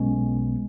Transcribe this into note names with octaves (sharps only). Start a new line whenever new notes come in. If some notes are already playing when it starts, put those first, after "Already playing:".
Already playing: B1 B2 G#3 C#4